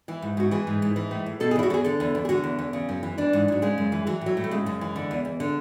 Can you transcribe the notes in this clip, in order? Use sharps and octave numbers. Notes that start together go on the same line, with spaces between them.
E3 E4
G#2
G#2 F#4
E3 G#4
G#2
G#2
E3
A2
A2
B2 A4
G#4
E2 E4
F#4
E2 G#4 A4
D3 A4
E2
E2
G#4
D3 F#4
E2
E2
C#3
F#2
E3
E3 D4
G#2
G#2 F#3
C#3 G#3
F#2
E3
E3 F#3
A2 F#3
A2
A3
C#3 G#3
F#2
E3
D3
E2
E2
D3